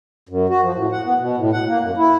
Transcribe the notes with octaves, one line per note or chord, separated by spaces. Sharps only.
F#2
F#4
F3
A2
F#5
B3
B2
A2
F#5
A#3
F#2
E4